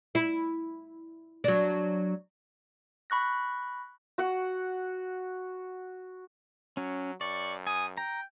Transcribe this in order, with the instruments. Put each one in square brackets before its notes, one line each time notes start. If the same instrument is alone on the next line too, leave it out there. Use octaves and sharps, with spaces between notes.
[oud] E4
F#3 D4
[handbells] B5 C#6 F#6 A#6
[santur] F#4 F#5
[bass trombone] F#3 [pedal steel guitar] C#4
[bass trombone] F#2 [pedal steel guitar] D5 [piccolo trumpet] C#6
[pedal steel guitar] G#5 [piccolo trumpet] D#6
[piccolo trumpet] G5 [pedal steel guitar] A#5